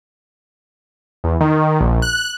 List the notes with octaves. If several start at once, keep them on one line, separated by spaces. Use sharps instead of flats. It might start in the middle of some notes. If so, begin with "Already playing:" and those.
E2
D#3
A#1
F#6